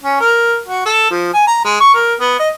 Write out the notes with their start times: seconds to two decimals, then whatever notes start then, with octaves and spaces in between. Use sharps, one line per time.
0.03 C#4
0.21 A#4
0.68 F#4
0.86 A4
1.11 F3
1.34 G#5
1.48 A#5
1.65 G#3
1.81 C#6
1.94 A#4
2.20 B3
2.40 D#5